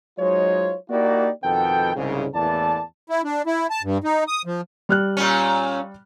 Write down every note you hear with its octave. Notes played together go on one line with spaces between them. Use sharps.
F#3 G#3 D#4 F4 C5 C#5
A#3 D#4 E4 F#4 G4 D5
F2 B2 D#3 B3 A4 G5
C2 G#2 C#3
E2 A2 E3 A#3 D5 A5
E4
D4
E4
A5
G2
D#4
D#6
F3
G3 F6 F#6
A#2 C#4